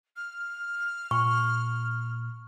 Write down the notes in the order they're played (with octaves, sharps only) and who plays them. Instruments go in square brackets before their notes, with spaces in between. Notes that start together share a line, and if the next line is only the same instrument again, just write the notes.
[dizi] F6
[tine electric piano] A#2 [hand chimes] C#6